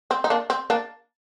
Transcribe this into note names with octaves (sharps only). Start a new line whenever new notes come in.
C4
D#4
A#3 D4
C4
A#3 D4